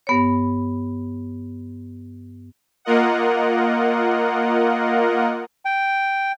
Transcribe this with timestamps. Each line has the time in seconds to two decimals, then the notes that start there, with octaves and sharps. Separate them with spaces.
0.07 G2 B3 C#5
2.85 A#3 F4 A#4 D#5 F#5
5.65 G5